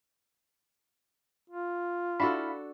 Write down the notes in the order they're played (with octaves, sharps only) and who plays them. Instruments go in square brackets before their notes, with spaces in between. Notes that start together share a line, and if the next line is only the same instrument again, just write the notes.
[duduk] F4
[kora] D4 F#4 A4 [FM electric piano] E4 F5 B5